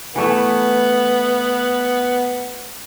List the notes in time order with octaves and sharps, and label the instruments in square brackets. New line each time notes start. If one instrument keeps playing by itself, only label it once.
[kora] E3 A3 E4 [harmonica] B3